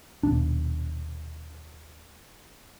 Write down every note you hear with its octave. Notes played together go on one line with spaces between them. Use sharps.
D#1 A#1 B2 D4